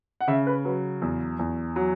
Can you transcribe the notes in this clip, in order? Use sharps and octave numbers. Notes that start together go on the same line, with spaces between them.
F#5
C#3 E5
B4
F#3 B4
E2
E2
F#3